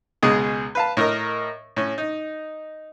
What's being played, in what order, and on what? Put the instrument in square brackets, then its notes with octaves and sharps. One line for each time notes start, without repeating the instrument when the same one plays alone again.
[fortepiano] C#2 B2 G#3 G#4 D#6
B4 F5 A5
A2 A#4 D#5
A2 C#4
D#4